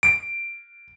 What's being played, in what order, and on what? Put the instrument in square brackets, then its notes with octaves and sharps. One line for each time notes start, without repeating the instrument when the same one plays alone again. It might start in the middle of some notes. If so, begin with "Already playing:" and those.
[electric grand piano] D7